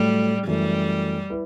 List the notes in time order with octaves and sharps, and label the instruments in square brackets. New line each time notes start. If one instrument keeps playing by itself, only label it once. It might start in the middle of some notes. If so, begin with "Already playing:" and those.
Already playing: [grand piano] A2 F#3 A3 [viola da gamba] G3
[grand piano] F#2 E3 A3 [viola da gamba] G3
[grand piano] E4 B4